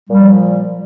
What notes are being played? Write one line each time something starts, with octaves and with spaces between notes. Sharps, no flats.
A#2 F3 G3